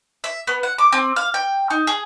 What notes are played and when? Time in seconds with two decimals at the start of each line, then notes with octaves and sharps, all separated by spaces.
0.24 E5
0.47 B3
0.63 F#5
0.78 D6
0.92 C4
1.16 F5
1.34 G5
1.70 D#4
1.87 G#4